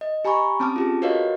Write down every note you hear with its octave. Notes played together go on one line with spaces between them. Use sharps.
D#5
G4 G#5 A#5 B5 C#6
C4 C#4 A5 D6 F6
F4 G4 G#4
F#4 A#4 B4 C#5 D#5 F5